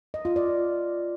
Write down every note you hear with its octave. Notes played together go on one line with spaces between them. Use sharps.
D#5
F4
D5